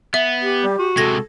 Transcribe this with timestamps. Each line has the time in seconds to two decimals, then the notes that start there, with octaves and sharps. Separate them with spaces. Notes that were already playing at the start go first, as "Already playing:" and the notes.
0.14 B3 E5
0.42 G4
0.64 G3
0.79 F#4
0.97 C3 G#3 A4 G#6 A#6